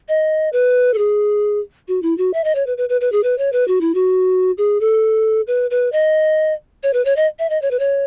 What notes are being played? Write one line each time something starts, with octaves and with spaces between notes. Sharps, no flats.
D#5
B4
A4
G#4
F#4
E4
F#4
E5
D#5
C#5
B4
B4
B4
B4
G#4
B4
C#5
B4
F#4
E4
F#4
G#4
A4
B4
B4
D#5
C#5
B4
C#5
D#5
E5
D#5
C#5
B4
C#5